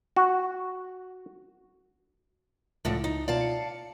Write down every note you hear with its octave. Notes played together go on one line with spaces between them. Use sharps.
F#4
C#2 A2 D3 F3
D#4
B2 F4 D5 F5 A5
C#7